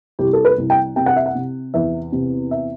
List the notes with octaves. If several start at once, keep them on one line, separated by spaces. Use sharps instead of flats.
C2 G4
A4
B4
C2
G5
C3 G5
F#5
E5
F#5
C3
E2 E5
C3
E5